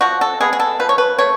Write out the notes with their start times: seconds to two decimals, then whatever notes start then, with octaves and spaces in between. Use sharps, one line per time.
0.01 F3 F#4
0.21 A4
0.40 G#3 B3 G#4
0.53 G#4
0.60 A4
0.79 F3 B4
0.89 C#5
0.98 B4
1.18 A3 C#5